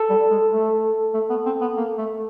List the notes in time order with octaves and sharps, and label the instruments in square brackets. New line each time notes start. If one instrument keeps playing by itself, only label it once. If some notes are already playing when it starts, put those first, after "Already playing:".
Already playing: [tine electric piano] A4
[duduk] G3
G#3
A3
A3
B3
C4
B3
A#3
A3